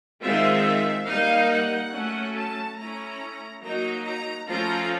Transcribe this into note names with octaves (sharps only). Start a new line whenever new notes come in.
D#3 G#3 C4 F4 E5
G3 A#3 D#4 F5
F#5
F#3 A3 C#4
A5
A3 C#4 E4 A#5
F#3 A#3 D#4 A#5
A#5
F3 A3 C#4 F4 A#5